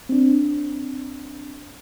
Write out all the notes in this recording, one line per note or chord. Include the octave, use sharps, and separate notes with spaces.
C4 D4